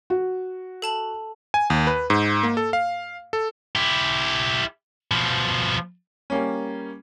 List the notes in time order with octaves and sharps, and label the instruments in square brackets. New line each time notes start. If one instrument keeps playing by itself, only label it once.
[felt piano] F#4
[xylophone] A4 A5 F#7
[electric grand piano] G#5
D#2
B4
G#2
A#3
A4
F5
A4
[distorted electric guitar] E4 G4
B2 F3
[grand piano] G3 A#3 C#4